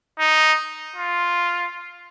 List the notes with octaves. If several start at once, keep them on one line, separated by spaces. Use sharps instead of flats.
D#4
F4